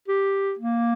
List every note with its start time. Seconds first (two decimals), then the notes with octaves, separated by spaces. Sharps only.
0.08 G4
0.59 A#3